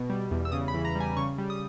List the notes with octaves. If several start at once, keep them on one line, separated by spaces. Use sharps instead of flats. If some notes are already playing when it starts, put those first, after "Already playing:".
Already playing: B2
G3
E2
E6
C#3 D#6
B5
E3
A#5
G3
G#5
C#3 C#6
G3
D#6